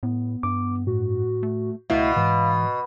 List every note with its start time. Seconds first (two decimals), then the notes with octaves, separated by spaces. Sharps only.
0.03 A2 B3
0.43 G2 D6
0.87 A2 F#4
1.43 A3
1.90 C#2 B2 A3 E4 E5 F5
2.17 G#2 E3